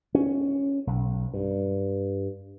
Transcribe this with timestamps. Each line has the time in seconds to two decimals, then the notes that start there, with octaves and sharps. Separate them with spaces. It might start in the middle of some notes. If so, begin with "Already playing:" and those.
0.15 C#4
0.87 B1
1.34 G2